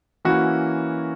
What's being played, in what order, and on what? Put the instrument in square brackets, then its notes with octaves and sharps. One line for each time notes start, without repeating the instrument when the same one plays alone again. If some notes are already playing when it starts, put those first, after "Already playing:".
[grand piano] E3 A#3 C#4 E4 [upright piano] F#4